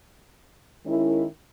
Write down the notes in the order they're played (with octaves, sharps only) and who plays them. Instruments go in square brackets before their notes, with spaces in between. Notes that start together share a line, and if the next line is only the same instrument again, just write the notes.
[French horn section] D#3 G#3 C#4 E4 A#4